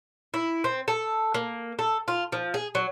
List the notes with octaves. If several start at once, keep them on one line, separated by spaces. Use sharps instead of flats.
E4
C4
A4
A#3
A4
F4
F3
G#4
F#3